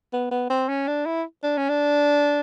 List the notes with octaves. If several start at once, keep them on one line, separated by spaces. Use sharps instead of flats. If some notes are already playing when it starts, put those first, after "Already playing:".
B3
B3
C4
C#4
D4
E4
D4
C#4
D4